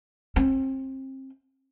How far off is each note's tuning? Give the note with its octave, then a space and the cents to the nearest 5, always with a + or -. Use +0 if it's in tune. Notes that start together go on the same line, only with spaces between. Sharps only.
C4 +30